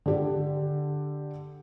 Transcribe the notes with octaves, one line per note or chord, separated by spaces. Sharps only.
D3 G4 A4